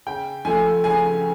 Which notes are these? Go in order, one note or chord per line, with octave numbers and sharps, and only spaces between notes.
C#3 G5
F3 A3 G#5
C#3 G#5